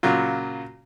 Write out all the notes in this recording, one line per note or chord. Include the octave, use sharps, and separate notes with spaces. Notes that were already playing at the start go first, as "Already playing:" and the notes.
A#2 C#3 F#3 F4